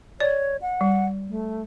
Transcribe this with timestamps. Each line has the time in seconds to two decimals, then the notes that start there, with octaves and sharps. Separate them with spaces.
0.20 C#5 D5
0.62 F#5
0.81 G3
1.29 A3